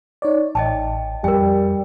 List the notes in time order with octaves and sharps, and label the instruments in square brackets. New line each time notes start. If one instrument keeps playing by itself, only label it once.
[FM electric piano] D#4 C#5 D5
[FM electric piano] A1 [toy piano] D#5 G5 A5
[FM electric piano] F2 [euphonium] G3 [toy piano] A#4 G5